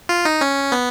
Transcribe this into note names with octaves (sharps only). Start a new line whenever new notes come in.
F4
D#4
C#4
B3